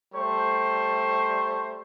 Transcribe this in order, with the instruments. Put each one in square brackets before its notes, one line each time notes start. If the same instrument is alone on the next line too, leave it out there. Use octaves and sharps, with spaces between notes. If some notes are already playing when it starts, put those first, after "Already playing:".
[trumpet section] G3 A3 A4 C5 C#6